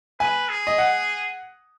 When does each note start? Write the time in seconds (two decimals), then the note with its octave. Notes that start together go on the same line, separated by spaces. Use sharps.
0.20 B4 G#5
0.49 G#4
0.67 D#5
0.78 F#5